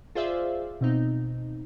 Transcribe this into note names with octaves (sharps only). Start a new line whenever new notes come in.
F4 G#4 C5 D5 E5 F5
B2 C4 D#4